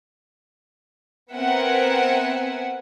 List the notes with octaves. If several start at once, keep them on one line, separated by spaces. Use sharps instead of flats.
B3 C4 A#4 E5 F#5 G#5